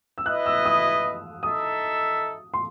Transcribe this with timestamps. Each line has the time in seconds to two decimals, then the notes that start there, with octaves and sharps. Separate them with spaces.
0.18 E6
0.26 E4 B4 D#5 F#6
0.46 E6
0.65 D#6
1.43 D#4 A4 E5 D#6
2.54 C6